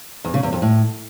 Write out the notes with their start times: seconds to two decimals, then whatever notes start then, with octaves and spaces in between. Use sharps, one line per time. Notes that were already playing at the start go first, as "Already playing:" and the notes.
0.24 E2
0.34 C#3
0.43 E2
0.53 F2
0.62 A2